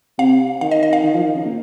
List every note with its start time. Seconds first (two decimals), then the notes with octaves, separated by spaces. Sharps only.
0.19 C3 F5
0.61 D#3 F5
0.71 D#5
0.83 D#5
0.93 F5
1.04 D#3
1.14 F3
1.25 D#3
1.35 C#3
1.46 A#2